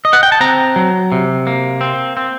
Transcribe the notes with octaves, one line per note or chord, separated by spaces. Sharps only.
D#5
F#5
G5
A5
C4 A#5
F#3
C3
A#3
C4
C4